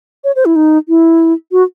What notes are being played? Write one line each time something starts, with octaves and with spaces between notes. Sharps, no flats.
C#5
C5
E4
D#4
E4
F#4